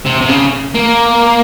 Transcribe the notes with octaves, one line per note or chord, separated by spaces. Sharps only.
C3
C3
C#3
A#3